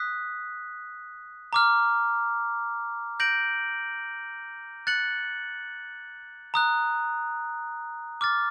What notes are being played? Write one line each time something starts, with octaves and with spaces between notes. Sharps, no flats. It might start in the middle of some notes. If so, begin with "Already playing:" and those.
Already playing: D#6 F#6 B6
A#5 D6 F6
G6 A#6 D7 F#7
F#6 A6 C#7 F#7
A#5 D#6 F#6
D6 F6 A6